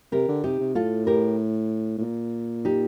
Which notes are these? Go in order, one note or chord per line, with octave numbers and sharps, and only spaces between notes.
C3 G4 A#4
D3
C3 D#4 G4
C3
A2 F4 A4
G4 A#4
A2
A#2
D#4 G4